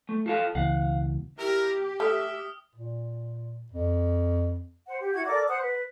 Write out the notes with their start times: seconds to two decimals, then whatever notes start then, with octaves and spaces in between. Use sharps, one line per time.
0.09 A3
0.26 F4 A4 F5
0.55 C#2 B2 E3 F5 F#5
1.38 E4 G4 A#4
2.00 A3 E5 D#6 F6
2.76 A#2
3.72 F2
4.86 C5 F#5
5.00 G4
5.14 E4 F#4 F#5 G#6
5.26 A4 A#4 D5 D6
5.48 C5 F#5 D#6 F#6
5.61 B4